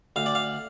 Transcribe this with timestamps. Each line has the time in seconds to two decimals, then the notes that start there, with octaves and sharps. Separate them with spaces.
0.16 D2 F5
0.26 D5
0.35 F5